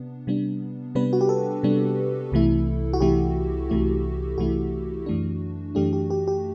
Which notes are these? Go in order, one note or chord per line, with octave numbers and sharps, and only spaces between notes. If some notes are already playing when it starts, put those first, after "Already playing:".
Already playing: C3 B3 D4
C3 G3 B3 D4
C3 G3 B3 D4 B4
F#4
G4
A4
C3 G3 B3 D4
C2 C3 E3 A3 E4
F#4
C2 C3 E3 A3 E4 G4
C2 C3 E3 A3 E4
C2 C3 E3 A3 E4 F#4
F#2 E3 A3 D4
F#2 E3 A3 D4 G4
G4
G4
G4